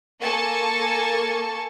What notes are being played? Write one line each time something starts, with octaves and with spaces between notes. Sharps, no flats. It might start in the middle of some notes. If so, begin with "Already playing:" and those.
A#3 A4 G#5 A5 C#6